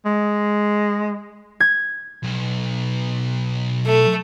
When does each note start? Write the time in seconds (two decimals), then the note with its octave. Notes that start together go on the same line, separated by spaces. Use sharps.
0.05 G#3
1.60 G#6
2.23 B1
3.86 A3